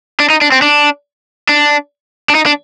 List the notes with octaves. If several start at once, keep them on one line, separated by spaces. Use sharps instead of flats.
D4
D#4
D4
C4
D4
D4
D4
D#4
D4